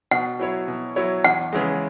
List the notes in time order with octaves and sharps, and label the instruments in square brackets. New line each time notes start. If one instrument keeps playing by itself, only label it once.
[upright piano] B2 [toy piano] F#5
[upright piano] F#3 E4 C#5
B2
F#3 E4 C#5
[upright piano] E2 [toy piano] F#5
[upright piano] C#3 E3 G#3